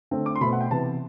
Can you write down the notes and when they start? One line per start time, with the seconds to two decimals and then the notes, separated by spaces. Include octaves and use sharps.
0.11 D3 A3 C4
0.26 D6
0.36 C6
0.41 B2 A3 C4 B5
0.53 F#5
0.61 G5
0.71 C3 E3 B3 A5